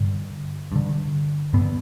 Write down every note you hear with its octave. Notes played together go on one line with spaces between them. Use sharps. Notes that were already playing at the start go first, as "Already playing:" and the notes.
Already playing: G2 D3
G2 D3
G2 D3 B3